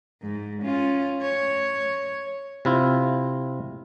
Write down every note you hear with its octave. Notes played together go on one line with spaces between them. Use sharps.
G#2
C#4 F4
C#5
C3 E4 F4